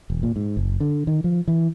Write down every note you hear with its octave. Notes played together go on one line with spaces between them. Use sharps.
E1
A#2
G#2
F#1
D3
D#3
F3
E3